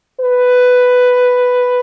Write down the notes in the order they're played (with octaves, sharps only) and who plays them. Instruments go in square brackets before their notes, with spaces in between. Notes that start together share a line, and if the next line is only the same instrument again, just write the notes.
[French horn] B4